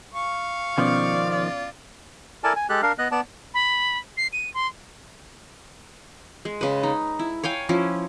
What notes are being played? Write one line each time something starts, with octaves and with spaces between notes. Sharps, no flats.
F5 C#6
B2 D#3 F3 B3 C#4 D5
F4
E4 A4 A#4 D5 G#5 A5
G#5
G#3 G4 A4 F#6
D4 A#4 F5
B3 D#5 F#6
B3 D5 A5
B5
C7
D#7
C6
G#3
C#3 B4
D#4
E4
C#5 F5 G5 G#5
F3 C#4 E4